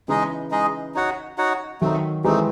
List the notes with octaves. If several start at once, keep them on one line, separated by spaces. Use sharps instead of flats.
C#3 E3 G#3 D#4 G#4 D#5
G#3 D#4 G#4 D#5
D#4 F#4 C#5 F#5
D#4 F#4 C#5 F#5
D#3 F#3 A3 C4 D#4
E3 G#3 A3 C4 D#4